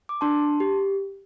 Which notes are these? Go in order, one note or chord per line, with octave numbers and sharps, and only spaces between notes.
D6
D4 A5 C6
G4